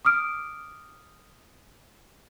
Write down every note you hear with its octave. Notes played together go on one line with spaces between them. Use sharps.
D6 D#6 F6 D7